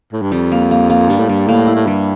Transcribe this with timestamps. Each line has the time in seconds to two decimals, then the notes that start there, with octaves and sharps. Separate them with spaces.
0.12 A2
0.22 G2
0.32 F2 G3
0.52 A#3
0.71 A#3
0.90 A#3
1.09 G2 G3
1.19 A2
1.29 G2 G3
1.48 A2 A#3
1.67 E4
1.75 A2
1.87 G2 G3